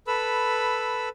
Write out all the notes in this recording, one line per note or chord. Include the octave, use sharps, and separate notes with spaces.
A4 B4 B5 E6